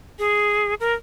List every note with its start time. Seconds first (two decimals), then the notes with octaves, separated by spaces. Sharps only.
0.19 G#4
0.80 A#4